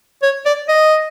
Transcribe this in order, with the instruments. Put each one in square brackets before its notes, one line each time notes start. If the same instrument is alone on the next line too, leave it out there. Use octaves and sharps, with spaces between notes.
[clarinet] C#5
D5
D#5